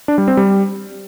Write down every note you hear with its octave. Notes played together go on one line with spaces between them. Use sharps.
D4
G3
C4
G3